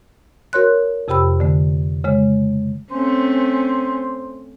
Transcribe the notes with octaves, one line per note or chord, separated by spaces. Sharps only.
F#4 A#4 C#5 C6 F#6
F2 C3 G4 G5 B5 E6
D3 A3
C#3 G#3
A3 C4 C#4 C5